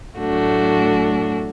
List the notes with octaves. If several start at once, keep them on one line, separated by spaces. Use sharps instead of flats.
A2 F#3 A3 D4 F#4